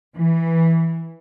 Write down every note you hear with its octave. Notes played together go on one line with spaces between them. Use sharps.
E3